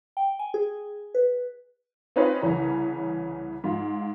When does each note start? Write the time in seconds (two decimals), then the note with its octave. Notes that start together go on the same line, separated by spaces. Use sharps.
0.17 G5
0.39 G#5
0.54 G#4
1.15 B4
2.16 C4 C#4 D#4 F4 B4 C#5
2.42 C2 C#3 E3 C#4 A#5
3.64 G#2 F4